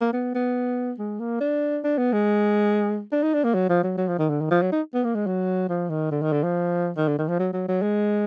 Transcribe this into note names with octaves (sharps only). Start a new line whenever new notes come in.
A#3
B3
B3
G#3
A#3
D4
D4
B3
G#3
D4
D#4
D4
A#3
F#3
F3
F#3
F#3
F3
D#3
D3
D#3
F3
F#3
D#4
B3
A#3
G#3
F#3
F3
D#3
D3
D#3
D3
F3
D#3
D3
D#3
F3
F#3
F#3
F#3
G#3